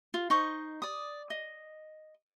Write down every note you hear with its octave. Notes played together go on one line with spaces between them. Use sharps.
F4
D#4 C5 C#6 D#6
D5 D#6
D#5